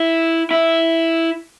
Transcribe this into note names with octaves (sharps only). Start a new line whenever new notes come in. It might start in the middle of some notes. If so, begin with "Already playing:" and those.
Already playing: E4
E4